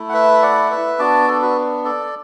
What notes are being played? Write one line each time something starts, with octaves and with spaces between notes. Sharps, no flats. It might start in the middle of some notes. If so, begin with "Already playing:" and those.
Already playing: A3 E4
F#5
B4 E5
D5 F#5
B4 E5
B3 D4 F#4 A5 D6
A4 D5
F#4 B4
A4 D5